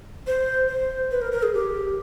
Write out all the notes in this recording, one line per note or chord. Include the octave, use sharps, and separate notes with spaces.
C5
C5
B4
A#4
A#4
G#4
G4